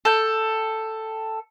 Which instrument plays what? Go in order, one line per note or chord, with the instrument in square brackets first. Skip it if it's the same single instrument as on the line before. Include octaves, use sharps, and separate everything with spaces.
[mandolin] A4 G5